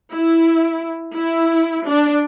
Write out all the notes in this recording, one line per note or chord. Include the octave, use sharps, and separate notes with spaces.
E4
E4
D4